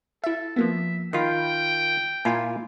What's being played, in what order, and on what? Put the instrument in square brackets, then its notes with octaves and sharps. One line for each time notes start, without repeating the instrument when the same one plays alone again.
[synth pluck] E4 E5 [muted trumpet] A4
[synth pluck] F3 A#3 B3 [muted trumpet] E5
[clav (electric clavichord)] D#3 F4 [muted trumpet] G5 [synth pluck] B5
[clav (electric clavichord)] A#2 E4 F4 [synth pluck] G#5